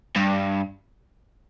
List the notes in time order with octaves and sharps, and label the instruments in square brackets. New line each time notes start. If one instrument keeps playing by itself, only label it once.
[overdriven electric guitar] G2